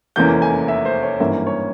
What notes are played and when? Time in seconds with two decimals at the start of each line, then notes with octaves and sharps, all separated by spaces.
0.16 F1 E2 E3 A#3 C#4 G6
0.42 G#5
0.68 E5
0.85 C5
1.03 C#5
1.20 G#1 G2 E3 A#3 C#4 E5
1.47 C#5